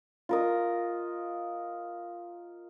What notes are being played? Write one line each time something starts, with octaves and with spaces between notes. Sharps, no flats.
F4 A#4 D#5